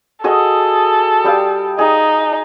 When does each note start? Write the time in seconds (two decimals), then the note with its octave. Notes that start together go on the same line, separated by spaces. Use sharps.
0.24 F#4 G#4 A4 D#5
1.24 G3 G4 F5
1.79 D#4 G#4